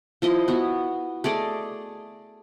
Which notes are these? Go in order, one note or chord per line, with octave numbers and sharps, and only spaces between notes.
F3 E4 D#5
B3 F#4
A3 G#4 D5 D#5